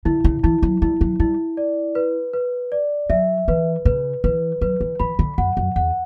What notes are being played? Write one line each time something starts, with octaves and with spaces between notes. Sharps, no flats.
D3 E4
C#3
E3 E4
F#3
G3 E4
F#3
G3 E4
D5
B4
B4
D5
F#3 E5
E3 B4
C#3 B4
E3 B4
F#3 B4
E3
E3 B5
D3
F#2 F#5
F#2
E2 F#5